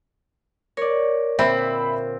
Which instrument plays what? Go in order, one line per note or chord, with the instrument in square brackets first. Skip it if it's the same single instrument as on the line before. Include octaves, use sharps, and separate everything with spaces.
[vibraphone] A#4 [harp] C#5 D5
[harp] A#2 D3 [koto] C4 [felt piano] C5 E5 B5